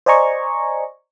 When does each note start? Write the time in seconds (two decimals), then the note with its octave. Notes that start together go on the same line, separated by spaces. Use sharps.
0.06 C5 D5 D#5 G#5 A#5 C#6